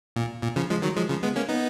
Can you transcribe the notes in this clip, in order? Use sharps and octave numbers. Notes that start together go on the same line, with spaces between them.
A#2
A#2
C#3 F3
F3 G#3
D#3 F#3
F3 G#3
C#3 F3
G#3 B3
A#3 C#4
B3 D#4